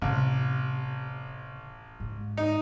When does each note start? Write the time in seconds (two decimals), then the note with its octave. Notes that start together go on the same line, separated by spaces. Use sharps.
0.02 A1 C3
2.00 G#2
2.37 D#4